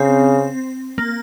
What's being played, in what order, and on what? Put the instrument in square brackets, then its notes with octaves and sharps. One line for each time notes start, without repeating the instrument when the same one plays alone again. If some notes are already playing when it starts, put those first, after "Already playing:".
Already playing: [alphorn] C#3 [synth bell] C4
[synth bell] A#3